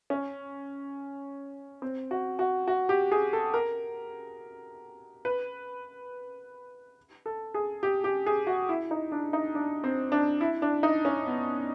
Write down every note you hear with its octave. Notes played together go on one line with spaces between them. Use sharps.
C#4
C4
F#4
F#4
F#4
G4
G#4
A4
A#4
B4
A4
G#4
G4
G4
G#4
F#4
E4
D#4
D4
D#4
D4
C4
D4
E4
D4
D#4
C#4
B3